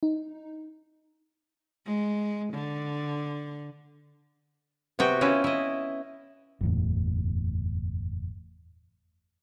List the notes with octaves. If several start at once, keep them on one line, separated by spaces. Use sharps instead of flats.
D#4
G#3
D3
C3 B3 F#4 G5
C#4 E4 F4 B4
E4 D#5
F#1 E2 A2